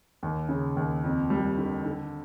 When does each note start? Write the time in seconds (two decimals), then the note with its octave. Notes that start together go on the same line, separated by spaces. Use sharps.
0.23 D#2
0.49 C#3
0.76 D#2
1.04 F2
1.30 G3
1.58 D3
1.85 D3